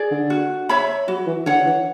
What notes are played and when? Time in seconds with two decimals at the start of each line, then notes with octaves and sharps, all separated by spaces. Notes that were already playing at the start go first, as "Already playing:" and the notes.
Already playing: G#4 D5
0.11 D3
0.30 F#4
0.69 C#5 E5 B5
1.08 F#3 F#4
1.26 E3
1.46 D3 C#5 F#5
1.66 E3